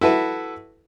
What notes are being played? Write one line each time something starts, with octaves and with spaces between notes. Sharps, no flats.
E4 F#4 A4 B4